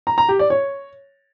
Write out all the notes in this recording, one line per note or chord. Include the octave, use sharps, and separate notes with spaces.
A#5
A#5
G4
D5
C#5